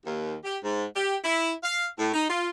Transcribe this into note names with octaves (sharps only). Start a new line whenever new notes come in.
D#2
G4
G#2
G4
E4
F5
A2
D#4
F4